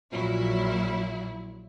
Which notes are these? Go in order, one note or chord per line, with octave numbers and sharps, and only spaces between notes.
A#1 A#2 F#3 E4